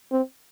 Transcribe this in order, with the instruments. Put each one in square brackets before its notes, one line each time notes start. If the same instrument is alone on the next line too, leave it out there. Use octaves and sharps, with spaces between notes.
[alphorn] C4